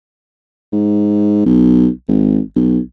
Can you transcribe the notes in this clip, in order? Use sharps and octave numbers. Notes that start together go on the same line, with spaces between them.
G#2
B1
G#1
B1